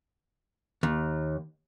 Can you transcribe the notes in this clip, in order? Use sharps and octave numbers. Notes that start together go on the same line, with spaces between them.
D#2